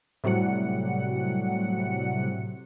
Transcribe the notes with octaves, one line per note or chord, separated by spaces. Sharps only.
A2 C3 F#3 G3 F#5 C#7